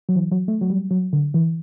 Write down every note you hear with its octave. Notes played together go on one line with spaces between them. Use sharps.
F#3
E3
F#3
A3
F#3
G3
F#3
D3
E3